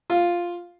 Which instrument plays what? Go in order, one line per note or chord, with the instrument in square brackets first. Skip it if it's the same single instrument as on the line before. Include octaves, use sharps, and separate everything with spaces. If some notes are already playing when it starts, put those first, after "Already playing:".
[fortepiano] F4